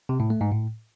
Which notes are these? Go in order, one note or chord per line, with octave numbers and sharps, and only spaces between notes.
C3
A2
A3
G#2
A2